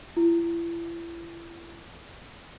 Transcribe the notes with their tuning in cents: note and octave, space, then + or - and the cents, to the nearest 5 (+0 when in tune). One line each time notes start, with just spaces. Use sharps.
E4 +40